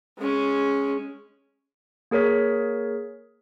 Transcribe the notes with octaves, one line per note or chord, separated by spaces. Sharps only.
G#3 C#4
A#3 G#4 A#4 C#5 B6